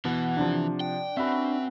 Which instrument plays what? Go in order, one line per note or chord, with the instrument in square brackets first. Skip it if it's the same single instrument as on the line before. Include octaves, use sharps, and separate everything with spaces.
[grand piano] B2 [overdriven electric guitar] E3 [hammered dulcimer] F#5
[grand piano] C3 F3 [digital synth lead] D4
[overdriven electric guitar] G5
[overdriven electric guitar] C4 [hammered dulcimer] C#4 F#4 B4 [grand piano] E5